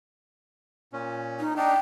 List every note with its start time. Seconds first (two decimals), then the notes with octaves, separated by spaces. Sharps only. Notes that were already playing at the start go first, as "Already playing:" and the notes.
0.93 A#2 C#4
1.40 D#4
1.57 D4 D#4 G5